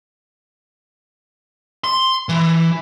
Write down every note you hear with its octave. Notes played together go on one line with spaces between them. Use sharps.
C6
E3